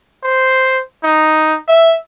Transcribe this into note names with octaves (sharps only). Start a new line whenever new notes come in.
C5
D#4
E5